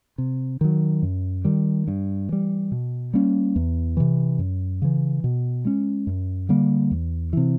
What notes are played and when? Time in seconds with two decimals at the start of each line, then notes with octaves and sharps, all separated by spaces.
0.18 C3
0.61 D#3 F#3
1.03 F#2
1.45 D#3 G3
1.88 G2
2.29 E3 G3
2.72 B2
3.13 G3 A#3 C#4
3.56 E2
3.97 C3 E3
4.39 F#2
4.82 C#3 E3
5.24 B2
5.65 G#3 C#4
6.07 F#2
6.49 D3 G3 A#3
6.91 E2
7.33 C3 E3